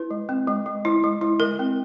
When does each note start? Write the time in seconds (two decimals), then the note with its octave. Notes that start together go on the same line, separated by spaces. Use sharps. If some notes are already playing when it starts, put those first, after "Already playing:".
Already playing: E4 B4
0.11 G#3
0.29 C4
0.47 G#3
0.66 G#3
0.85 E4
1.04 G#3
1.21 E4
1.40 G#3 A#4
1.59 C4